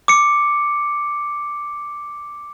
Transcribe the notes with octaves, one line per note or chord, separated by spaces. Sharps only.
D6 C#7